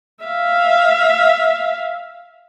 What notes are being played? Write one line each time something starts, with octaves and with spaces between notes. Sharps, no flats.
E5 F5